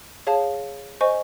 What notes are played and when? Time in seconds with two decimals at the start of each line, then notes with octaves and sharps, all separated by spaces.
0.27 G#4 C#5 F5 A5
1.01 C5 D#5 G#5 C#6